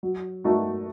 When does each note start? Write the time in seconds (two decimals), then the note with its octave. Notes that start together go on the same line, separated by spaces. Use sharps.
0.03 F#3
0.44 A3 D#4 F#4